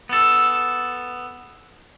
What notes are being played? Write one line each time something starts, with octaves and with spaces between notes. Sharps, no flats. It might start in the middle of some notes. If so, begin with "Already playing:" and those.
B3 A4